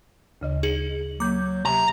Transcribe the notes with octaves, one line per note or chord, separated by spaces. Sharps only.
D2 C#3 D#5
D#4 G#4 F#7
F#3 A#3 D6 G6
C3 A#5